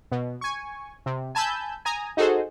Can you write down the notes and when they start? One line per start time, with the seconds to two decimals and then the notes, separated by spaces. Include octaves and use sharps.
0.12 B2
0.41 G#5 C#6
1.06 C3
1.35 G#5 A5 B5 E6 G6
1.85 G#5 A#5 D#6
2.17 D#4 F#4 G#4 A4 C5